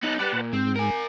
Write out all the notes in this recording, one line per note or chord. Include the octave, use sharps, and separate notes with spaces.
B3 D#4 A5 F#6
G4 B4 D5 F#5 A5
A#2
G#2 C4
A#4 G#5